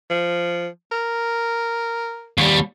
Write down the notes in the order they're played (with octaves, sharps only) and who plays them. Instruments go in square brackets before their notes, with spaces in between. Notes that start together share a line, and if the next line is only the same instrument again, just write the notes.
[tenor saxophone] F3
A#4
[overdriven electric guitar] D#2 G3